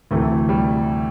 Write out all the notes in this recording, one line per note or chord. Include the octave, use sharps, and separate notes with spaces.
D2 C3 E3 A3
G3